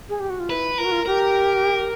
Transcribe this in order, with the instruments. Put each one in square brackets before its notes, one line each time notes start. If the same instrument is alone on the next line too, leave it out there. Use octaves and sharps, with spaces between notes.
[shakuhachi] G#4
G4
F#4
F4
[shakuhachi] E4 [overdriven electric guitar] B4
[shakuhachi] F4 [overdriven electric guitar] A#4
[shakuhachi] F#4
F4
[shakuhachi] G4 [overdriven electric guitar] A#4